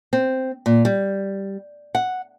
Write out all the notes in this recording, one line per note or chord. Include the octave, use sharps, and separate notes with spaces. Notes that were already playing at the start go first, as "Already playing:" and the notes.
C4
A#2
G3
F#5